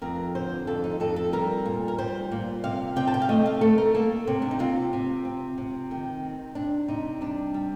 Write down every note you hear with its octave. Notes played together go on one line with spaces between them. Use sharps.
F2 A#4
D3 C5
F2 A4
D#4
F2 A4
A4
G3 A#4
A#2
A#4
G3 C5
A#2
C3 F5
C3 G5
A5
G5
F5
A3 D#5
F5
A3 A4
A#4
A#3 A4
C3
D4
D#4
C3 F4
C3
C4
C3
D#3
C4
C3 D4
C3 D#4
G3 D4
G3